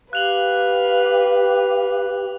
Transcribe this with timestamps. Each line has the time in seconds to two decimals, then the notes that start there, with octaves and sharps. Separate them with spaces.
0.13 G4 B4 F5 F#6 F7 F#7